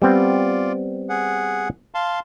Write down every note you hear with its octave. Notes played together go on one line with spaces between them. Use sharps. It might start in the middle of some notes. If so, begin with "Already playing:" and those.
G3 B3 C4 F4 D5
G#4 F#5
F5 A5 C6